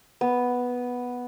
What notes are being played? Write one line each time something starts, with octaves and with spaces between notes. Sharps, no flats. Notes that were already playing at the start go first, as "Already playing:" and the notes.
B3